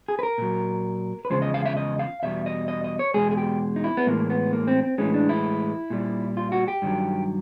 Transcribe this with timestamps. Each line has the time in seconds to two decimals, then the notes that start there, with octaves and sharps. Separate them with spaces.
0.08 G#4
0.19 B4
0.23 A#4
0.38 A#2 F#3
1.25 B4
1.30 E2 C#3 F3 G#3 C5
1.42 D#5
1.54 F5
1.66 E5
1.77 D#5
1.99 F5
2.23 E2 B2 G3 E5
2.46 D#5
2.68 D#5
2.84 D#5
2.99 C#5
3.14 E2 B2 G#3 G#4
3.31 G#4
3.37 G4
3.76 D#4
3.84 E4
3.97 B3
4.06 A2 E3 G#3 A#3
4.30 B3
4.53 A#3
4.67 C4
4.83 C4
4.98 A2 E3 G#3 C#4
5.14 D4
5.29 E4
5.90 A#2 G3
6.37 F4
6.52 F#4
6.68 G4
6.82 G2 D#3 F#3